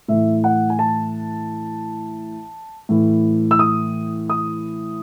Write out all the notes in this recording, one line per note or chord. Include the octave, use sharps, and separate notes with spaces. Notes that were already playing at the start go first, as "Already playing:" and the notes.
A2 E3 E5
F#5
G#5
A5
A2 E3
E6
D#6
D#6